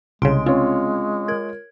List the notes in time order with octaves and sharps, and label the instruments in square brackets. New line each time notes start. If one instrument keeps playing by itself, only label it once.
[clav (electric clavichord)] C2 C#3 [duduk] G#3 [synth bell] C6 D7
[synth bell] C4 C#4 [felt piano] F4 C#5
[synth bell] A#4 G#6